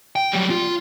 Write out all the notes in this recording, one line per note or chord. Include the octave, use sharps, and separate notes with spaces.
G5
F#3 G3
F4